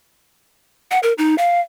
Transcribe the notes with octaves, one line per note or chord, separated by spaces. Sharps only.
F#5
A#4
D#4
F5